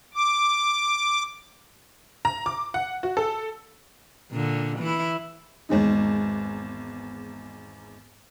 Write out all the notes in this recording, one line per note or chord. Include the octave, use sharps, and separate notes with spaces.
D6
A#5
D6
F#5
F#4
A4
A#2 D3
E3 E4
G#1 E2 G#3 D#4